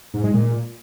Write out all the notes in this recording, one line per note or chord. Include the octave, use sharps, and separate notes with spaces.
G#2
G#3
A#2